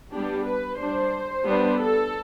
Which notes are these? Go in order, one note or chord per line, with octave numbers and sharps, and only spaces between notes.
G3 B3 D4 G4
B4
G3 D4 C5
G3 B3 D4
A4